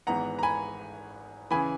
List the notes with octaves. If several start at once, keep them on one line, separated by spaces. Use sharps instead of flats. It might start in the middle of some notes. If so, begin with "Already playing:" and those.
G#1 G#2 E3 B3 F#5 A#5
A#5
G#5 B5
C#3 E3 G#5 B5